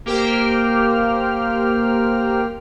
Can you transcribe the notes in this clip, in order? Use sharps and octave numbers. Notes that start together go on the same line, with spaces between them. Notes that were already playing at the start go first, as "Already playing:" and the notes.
A#3 G4 A#4 C5 G5 F6